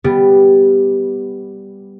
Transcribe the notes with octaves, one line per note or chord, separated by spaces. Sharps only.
G3 B3